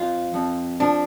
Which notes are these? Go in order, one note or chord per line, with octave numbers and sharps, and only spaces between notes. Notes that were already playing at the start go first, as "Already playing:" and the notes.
Already playing: F2 F4
F2
F3 D4